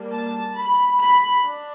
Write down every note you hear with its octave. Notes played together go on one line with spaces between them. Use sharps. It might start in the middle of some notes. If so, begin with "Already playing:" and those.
Already playing: G3 A#3 D4
A5
B5
B5
D4